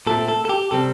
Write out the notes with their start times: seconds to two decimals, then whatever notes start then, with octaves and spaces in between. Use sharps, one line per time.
0.07 A#2 A3 C4 A4
0.28 A4
0.45 A4
0.49 G4
0.71 C3 G3 C4 A4